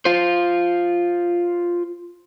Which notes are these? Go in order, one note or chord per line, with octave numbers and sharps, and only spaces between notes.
F4 C5